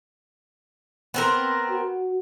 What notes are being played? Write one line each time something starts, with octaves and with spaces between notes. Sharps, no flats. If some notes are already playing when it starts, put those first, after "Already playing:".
B3 C4 A#4
F#4